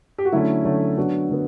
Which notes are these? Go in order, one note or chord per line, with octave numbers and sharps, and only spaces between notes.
G4
F#4
D3 F#3 A3 C#4 E4
D3 F#3 A3 C#4
D3 F#3 B3 D4 F#4
D3 F#3 B3